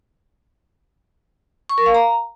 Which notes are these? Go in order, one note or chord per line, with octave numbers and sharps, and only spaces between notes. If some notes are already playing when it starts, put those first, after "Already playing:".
C#6
A#4
F5
A#5